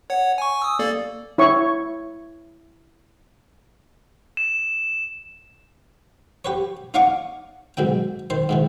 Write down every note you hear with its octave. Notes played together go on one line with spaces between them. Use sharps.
C#5 F#5
G#5 C#6
D#6 E6
A#3 A4 D5
E4 C#5 C#6
E7
G4 B4 C#5
D#4 C#5 F5 F#5 C#6 D6
B1 G#2 B2 G5
D#3 C5
G#2 D#3 E3